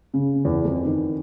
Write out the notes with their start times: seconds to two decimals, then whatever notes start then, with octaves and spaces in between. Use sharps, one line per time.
0.14 C#3
0.45 E2
0.65 F2
0.85 D#3